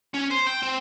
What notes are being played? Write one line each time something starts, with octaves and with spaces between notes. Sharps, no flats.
C#4
C5
G5
C4